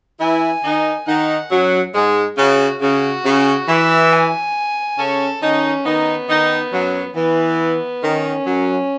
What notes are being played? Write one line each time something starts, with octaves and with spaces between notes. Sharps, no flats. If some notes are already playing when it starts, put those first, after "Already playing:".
E3 E4 G#5
D#3 D#4
D#3 D#4 F#5
F#2 F#3
G#2 G#3
C#3 F#4
C#3 F#4
C#3
E3 E5
G#5
C#3 C#4 A4
D#3 C#4 D#4
D#3 B3 D#4
D#3 D#4
F#2 F#3
E3 B3
D#3 C#4
F#2 F#3